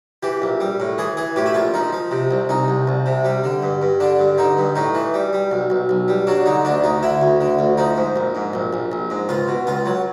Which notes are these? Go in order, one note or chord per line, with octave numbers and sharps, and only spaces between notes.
E3 G4
A#1
G3
A2
E3 G#4
E3 G#4
A2 G4
E4
A#1 F4
F3 D#4
F3
C3
C2
C2 D#4
C2
C2
C3
G3
D3
G2
G2
D3 D4
G2
D3 D#4
G2
A2 D#4
E3
G3
G3
B1
B1
B1
G3
F#3 D4
D3 D#4
D2 D4
D2 D#4
D3 E4
D2
D3
D2
F3 D#4
G#2
A#1
G#2
A#1
A#1
A#1
G#2
C#2 F4
B2
C#2 F4
F#3